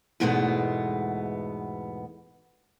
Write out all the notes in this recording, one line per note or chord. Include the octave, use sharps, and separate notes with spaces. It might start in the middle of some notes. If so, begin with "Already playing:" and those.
E2 G#2 B2 G#3 A3 B3